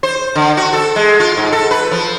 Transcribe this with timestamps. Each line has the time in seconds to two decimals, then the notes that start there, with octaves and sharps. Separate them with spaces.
0.03 C5
0.35 D3
0.57 F#4
0.73 A4
0.96 G#3
1.20 F4
1.37 G#2
1.52 A4
1.71 B4
1.91 F3